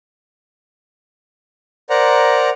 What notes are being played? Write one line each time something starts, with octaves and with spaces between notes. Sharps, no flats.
A#4 C5 D5 F#5 A#5